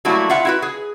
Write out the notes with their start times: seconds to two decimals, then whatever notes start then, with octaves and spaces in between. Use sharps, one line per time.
0.05 F#3 G3 A3 A#3 E4 F#4
0.29 F4 E5 F#5
0.45 E4 F#4 B4
0.62 G#4